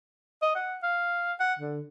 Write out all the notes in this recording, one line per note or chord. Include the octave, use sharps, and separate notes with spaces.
D#5
F#5
F5
F#5
D3